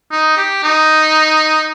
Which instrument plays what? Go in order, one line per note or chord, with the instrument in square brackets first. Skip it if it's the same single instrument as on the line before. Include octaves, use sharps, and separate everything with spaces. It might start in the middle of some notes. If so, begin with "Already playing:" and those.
[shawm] D#4
G4
D#4